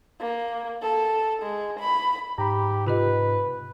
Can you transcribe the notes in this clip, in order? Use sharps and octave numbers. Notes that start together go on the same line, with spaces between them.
A#3
A4
G#3
B5
G#2 G4 A#5 B5
C3 F4 G4 B4 D#5